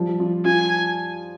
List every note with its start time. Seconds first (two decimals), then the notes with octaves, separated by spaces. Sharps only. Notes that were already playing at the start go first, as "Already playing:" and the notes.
Already playing: F3 G3
0.20 F4
0.45 F4 G#5